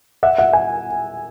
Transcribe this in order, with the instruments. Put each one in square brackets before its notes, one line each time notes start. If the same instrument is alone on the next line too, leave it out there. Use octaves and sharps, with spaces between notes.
[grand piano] E5 F#5
E5 F#5
F#5 G#5